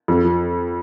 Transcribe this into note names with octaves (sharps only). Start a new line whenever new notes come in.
F2
F3